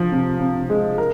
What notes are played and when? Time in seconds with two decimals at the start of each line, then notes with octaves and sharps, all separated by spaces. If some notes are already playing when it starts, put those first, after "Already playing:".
Already playing: F3
0.12 C3
0.40 C3
0.70 G#3
0.98 A#4